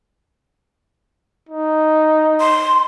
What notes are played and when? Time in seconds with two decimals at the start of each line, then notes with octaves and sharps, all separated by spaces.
1.49 D#4
2.41 C6